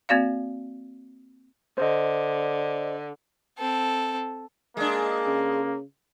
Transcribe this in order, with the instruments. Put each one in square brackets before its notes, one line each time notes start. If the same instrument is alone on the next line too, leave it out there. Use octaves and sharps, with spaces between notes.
[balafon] A#3 C4 F#4 D5 F5
[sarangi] D3 [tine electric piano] C5 D#5
[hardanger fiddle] C4 A4
[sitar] G#3 D4 [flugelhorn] A#3
[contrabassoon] C#3